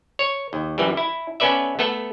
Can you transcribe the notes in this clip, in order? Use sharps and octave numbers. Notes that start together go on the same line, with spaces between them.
C#5
D#2
F#2 E3 G3
E4
B3 C#4 A4 B4 D5 E5
A3 B3 A4